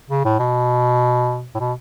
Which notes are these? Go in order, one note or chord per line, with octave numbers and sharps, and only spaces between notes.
C#3
A2
B2
A2
B2